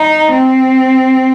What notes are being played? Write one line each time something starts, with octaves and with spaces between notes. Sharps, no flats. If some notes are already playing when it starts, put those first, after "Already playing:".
Already playing: D#4
C4